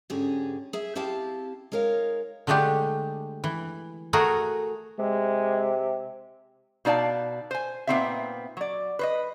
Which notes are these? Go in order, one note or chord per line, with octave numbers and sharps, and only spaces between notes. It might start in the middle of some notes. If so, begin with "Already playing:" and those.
G#2 D3 C#4 G4 G#4
G#4 E5
C4 E4 G4 F5 A5
G#3 D#4 A#4 C#5 F5
D3 G#3 A3 D4 G4
E3
A3 F#4 G#4 A#4 A#5
C3 G#3
B2 D#4 D5 F5 A5
C5 G#5
A#2 A3 B3 C4 D#4 E5
F#3 D5
B4 C5 D#5